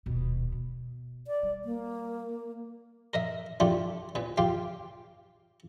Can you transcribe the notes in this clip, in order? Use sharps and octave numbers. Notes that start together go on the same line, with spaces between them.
D#1 B2
B2
D5
G3
A#3
A#4 D#5 E5
A3 D4 E4 F4 G4
A#2 B4
F4 G4 F5 G5